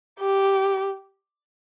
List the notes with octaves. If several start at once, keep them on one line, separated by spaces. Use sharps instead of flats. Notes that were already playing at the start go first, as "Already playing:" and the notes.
G4